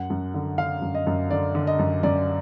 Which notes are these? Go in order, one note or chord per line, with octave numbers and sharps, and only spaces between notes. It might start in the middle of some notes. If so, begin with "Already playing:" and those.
Already playing: F#2 F#5
F#2
D3
D3 F5
F#2
D#5
F#2
D3 D5
D3
D#5
F#2
F#2 D5